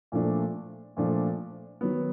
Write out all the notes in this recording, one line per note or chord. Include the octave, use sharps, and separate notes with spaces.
A#2 F3 A3 D4
A#2 F3 A3 D4
D#3 F#3 B3